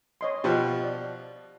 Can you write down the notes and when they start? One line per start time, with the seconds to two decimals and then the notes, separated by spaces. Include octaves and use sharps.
0.21 C#5 D#5 C6
0.44 B2 F3 G4
0.84 D5